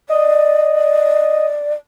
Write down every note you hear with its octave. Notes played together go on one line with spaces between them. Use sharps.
D5 D#5